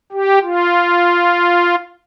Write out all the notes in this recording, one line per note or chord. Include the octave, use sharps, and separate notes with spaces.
G4
F4